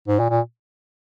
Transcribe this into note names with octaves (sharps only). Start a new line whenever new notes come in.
G#2
A#2
A#2